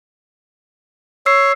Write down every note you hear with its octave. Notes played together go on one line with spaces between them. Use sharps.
C#5 E6 C7